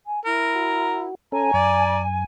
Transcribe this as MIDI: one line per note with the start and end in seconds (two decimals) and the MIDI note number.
0.06 0.19 80
0.25 1.09 64
0.25 1.07 70
0.55 1.15 66
1.32 1.51 61
1.32 1.51 69
1.32 2.24 80
1.32 1.99 82
1.54 2.24 42
1.54 2.00 74